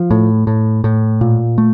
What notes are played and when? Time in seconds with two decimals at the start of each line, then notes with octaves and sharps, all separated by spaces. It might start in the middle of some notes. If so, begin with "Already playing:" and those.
Already playing: F3
0.11 A2
0.47 A2
0.84 A2
1.21 A#2
1.58 A3